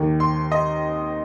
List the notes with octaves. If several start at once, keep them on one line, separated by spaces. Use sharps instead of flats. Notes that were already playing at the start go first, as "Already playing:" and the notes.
Already playing: D#2 D#3
C6
D#5